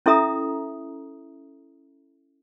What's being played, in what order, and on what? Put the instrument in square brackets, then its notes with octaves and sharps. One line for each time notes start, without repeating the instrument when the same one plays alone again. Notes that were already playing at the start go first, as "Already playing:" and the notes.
[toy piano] C#4 E4 A4 E5 A#5 D#6